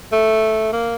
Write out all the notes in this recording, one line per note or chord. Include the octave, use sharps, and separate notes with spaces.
A3
A#3